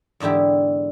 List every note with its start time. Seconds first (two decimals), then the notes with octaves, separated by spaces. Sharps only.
0.20 E2 G#2 D3 E4 G4